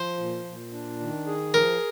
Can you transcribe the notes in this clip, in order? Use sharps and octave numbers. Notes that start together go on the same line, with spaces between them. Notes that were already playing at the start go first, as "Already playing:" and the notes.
Already playing: F3 C5
A#2
A#2
D4
D#3
G#4
F3 A#4